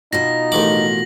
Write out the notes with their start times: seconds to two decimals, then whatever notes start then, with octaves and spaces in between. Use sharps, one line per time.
0.13 B2 D#4 F4 F#4 A#6
0.52 A1 D#3 D6 F#7